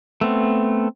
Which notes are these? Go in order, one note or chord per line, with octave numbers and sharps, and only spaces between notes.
A3 B3 C4